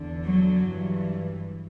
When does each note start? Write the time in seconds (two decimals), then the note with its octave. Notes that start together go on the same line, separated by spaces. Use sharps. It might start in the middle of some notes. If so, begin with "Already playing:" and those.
Already playing: E2 D3
0.25 F#3
0.64 G2 E3